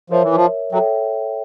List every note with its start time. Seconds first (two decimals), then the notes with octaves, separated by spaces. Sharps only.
0.10 F3 A#4 C#5 E5
0.23 E3
0.35 F3
0.72 F#3 A4 C#5 E5 G5